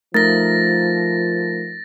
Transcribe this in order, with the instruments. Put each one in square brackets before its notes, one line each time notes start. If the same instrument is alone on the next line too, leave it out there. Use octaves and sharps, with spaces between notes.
[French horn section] F3 [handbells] A3 D#4 A#4 [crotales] A6 A#6